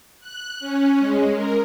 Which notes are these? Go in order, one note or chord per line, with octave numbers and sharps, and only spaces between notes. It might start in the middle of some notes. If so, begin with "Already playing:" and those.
F#6
C#4
G#3
A#4